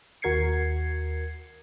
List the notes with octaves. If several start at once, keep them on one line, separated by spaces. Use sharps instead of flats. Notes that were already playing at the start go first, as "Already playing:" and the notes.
D#2 F#4 A#4 G#6 C7 C#7